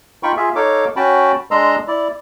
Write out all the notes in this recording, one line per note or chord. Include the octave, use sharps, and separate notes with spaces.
D#4 F4 G5 B5 C#6
F4 G#4 E5
D#4 A4 C#5 F5 D6
C#4 F#4 G5 A5 B5
G#3 D4 D#5 A#5 C6 E6
E4 D5